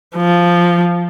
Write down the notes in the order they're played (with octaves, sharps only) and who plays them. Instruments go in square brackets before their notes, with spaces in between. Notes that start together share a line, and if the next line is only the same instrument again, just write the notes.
[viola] F3